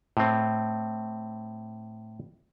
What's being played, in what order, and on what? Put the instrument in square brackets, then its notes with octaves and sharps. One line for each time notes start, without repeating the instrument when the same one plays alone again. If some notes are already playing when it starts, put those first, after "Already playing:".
[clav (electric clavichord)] A2 C4